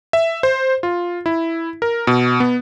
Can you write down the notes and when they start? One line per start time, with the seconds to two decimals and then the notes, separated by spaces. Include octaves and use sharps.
0.13 E5
0.43 C5
0.83 F4
1.26 E4
1.82 A#4
2.07 B2
2.40 B3